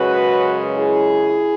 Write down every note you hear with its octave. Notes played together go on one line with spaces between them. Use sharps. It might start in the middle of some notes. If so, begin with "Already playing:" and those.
Already playing: F#2 C#3 G#3 F#4 B4
E4 G#4